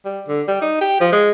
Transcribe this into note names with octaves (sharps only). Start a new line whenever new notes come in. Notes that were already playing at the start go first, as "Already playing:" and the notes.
G3
D3
G3
D#4
G4
F3
G#3